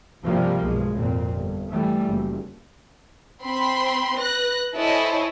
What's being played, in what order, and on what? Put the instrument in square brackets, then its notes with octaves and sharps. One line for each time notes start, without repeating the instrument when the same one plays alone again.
[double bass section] G2 C3 F3 G3 A#3
B1 G2 G#3
G#1 F2 A#2 C4
G1
E3 G3 A3
F#1
[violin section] C4 B5 C6
B4 F#6 A#6
E4 A4 C5 C#5 D#5 G#5